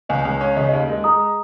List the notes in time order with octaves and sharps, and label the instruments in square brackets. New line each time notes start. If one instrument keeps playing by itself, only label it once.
[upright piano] C#2 [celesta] D#5 G#5
[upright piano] C#2
C#4
[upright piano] C#3 [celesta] D#5
[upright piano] D#2 [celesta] D#5
[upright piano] G#3
[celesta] D#5
[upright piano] G#3 [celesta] A#5 D#6